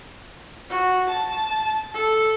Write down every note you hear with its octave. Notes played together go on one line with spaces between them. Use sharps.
F#4
A5
A4